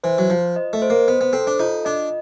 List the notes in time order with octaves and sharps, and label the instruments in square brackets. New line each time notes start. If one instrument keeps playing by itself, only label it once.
[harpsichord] E3 [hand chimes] C5
[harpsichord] F#3
[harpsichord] F3 [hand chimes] F4
[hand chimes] D#5
[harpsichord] A3
[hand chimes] C5
[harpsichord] A#3
[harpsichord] B3 [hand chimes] C5
[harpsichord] B3
[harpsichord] C4 [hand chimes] A4
[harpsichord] D4
[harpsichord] D#4 [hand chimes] F4
[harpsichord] D4 [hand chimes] D#5